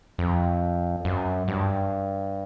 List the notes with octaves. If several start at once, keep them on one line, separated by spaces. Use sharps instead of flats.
F2
F#2
G2